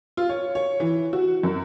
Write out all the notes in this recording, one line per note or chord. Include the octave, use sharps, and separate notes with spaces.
F4
C#5
C#5
E3
F#4
F#2